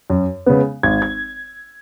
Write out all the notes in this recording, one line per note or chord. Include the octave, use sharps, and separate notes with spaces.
F#2
C#3 G#3 B3
G#1 G#6
G#6